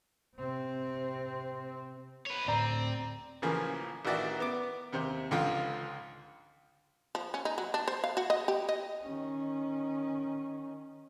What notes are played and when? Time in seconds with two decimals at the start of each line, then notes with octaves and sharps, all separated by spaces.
0.36 C3 C4
2.26 B4 C#5
2.48 A2 D3 C4 D5 A#5
3.42 A1 C#3 E3 F3 A#3
4.05 A1 D#3 E3 F#4 D5 E5
4.40 B3 D6
4.93 D#2 C3 C5
5.31 C#2 G#2 D3 F3 F4 F5
7.15 F3
7.34 C#4
7.45 D#4
7.58 F#3
7.74 D4
7.88 C5
8.04 F5
8.17 F#4
8.30 D#5
8.48 G4
8.69 D#5
9.04 D#3 C#4